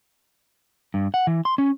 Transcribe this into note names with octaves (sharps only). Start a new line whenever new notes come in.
G2
F#5
E3
C6
C#4